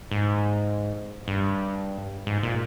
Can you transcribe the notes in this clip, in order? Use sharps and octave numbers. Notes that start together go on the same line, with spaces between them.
G#2
G2
G#2
A#2